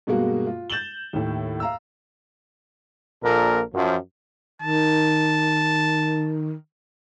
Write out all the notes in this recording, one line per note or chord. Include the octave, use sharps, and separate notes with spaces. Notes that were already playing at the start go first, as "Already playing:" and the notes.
G2 B2 G#3 A#3 F#4
F4
G6 A6 E7 F#7 G7
D#2 A2
F5 A#5 E6
A#1 A#2 A4 A#4
F#2 F3
D#3 A5